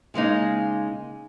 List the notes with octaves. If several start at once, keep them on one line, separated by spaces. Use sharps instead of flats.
C#3 G#3 A#3 D#4